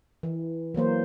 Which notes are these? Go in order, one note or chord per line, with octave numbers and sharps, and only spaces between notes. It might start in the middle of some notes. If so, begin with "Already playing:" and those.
E3
E3 F#3 A#3 C5